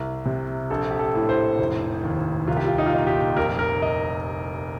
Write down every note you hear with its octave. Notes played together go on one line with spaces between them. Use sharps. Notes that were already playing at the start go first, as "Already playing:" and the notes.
Already playing: C2
C3
A#1 A4
G4
A4
A2
C5
F1
D#2
C2 F4
G4
F4
D#4
F4
A#2 D#4
G4
F1 A#4
A#4
D#5